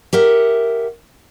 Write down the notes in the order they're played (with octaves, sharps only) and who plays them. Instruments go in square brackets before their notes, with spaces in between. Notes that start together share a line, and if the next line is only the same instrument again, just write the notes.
[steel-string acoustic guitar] G4 A#4 E5 F#5